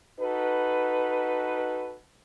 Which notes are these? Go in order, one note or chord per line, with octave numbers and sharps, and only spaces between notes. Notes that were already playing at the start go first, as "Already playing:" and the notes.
D#4 F#4 A4 B4